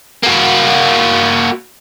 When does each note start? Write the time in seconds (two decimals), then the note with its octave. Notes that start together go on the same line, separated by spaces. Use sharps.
0.23 A#3 F#4